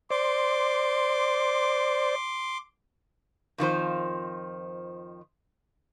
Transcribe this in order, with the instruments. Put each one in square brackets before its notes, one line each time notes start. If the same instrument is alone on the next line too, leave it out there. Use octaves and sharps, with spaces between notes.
[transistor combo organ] C5 D5 [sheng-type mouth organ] C6 D6
[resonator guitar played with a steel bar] F2 D#3 F3 C5